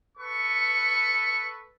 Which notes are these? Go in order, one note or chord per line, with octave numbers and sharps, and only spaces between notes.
A4 B4 C#6